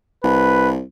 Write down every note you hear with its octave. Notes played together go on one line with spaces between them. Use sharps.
C2 B4